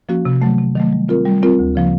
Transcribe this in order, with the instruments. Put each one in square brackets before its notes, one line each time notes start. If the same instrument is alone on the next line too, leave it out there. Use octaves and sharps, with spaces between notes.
[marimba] F3 A#3 C#4 F#4
C3
D#3 F#3 A3
C3
D#3 F#3 A3
G3
C4 F4 A#4
G3
C4 F4 A#4
D2
C#3 F3 A#3